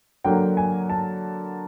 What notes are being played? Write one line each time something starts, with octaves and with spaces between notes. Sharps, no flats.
D3 F#3 A#3 G5
G#5
A5